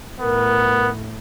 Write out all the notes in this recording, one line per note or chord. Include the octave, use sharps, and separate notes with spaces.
A2 B3 A#4